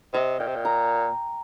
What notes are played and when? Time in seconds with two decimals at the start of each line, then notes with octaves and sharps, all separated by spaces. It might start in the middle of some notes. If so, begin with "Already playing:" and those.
0.14 C3 D#5
0.39 A#2 G5
0.47 C3
0.56 A#2
0.65 A#5